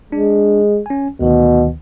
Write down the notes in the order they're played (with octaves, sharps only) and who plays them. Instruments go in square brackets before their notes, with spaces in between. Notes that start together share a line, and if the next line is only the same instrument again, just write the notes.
[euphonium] G#3 [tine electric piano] D4
[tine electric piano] C#4 G#5
[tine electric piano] D2 D#3 [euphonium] B2